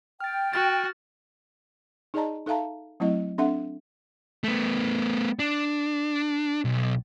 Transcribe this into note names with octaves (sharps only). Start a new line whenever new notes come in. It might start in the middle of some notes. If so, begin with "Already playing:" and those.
G5 F6 A6
F#4 F6 A6
D#4 G#4 D5 D#5 A5 A#5
D#4 A4 E5 F5 A5 A#5
F#3 A3 C4 E4 D#5
C4 D4 A4 E5 F#5
A3 B3
D4
B1